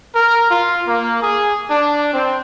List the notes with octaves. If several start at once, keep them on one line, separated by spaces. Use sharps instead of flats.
A#4
F4
A#3
G#4
D4
C4